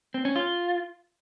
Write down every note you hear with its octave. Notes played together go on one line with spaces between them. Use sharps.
C4
C#4
F4